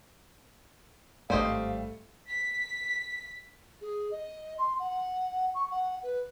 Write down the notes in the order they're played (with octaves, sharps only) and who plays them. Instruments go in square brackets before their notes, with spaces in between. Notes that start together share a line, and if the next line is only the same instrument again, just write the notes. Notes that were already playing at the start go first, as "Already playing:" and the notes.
[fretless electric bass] G#1 G2 [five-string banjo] G3 C5 D#5 [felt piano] A3 [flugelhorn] F5
[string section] B6
[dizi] G#4
D#5
C6
F#5
C#6
F#5
B4